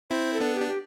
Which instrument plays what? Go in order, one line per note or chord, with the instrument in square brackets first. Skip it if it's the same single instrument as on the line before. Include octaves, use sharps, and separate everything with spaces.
[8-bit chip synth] C4 E4 [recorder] C5
[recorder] A4
[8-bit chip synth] B3 D4
[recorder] G4
[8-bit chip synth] D4
[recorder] G4